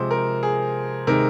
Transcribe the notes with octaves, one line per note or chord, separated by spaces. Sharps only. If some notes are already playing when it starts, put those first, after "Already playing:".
Already playing: C3 F3 G#3 C5
A#4
G#4
C3 D#3 G#3 A#4